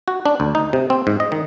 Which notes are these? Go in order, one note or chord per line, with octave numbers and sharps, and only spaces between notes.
F#4
D4
D2
D#4
C3
C4
G#2
D#5
D#3